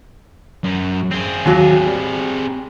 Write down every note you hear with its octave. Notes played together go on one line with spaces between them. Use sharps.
F#2
C4 G#4
D#2 F#3
G3